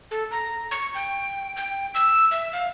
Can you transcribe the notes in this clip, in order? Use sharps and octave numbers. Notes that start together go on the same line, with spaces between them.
A4
A#5
C#6
G5
G5
E6
E5
F5